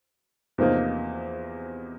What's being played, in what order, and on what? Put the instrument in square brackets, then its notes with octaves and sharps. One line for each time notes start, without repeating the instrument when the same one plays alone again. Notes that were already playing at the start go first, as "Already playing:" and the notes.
[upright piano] E2 C3 F3 A#3 D#4